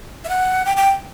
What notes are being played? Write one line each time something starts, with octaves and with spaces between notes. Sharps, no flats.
E5
F#5
G5
G5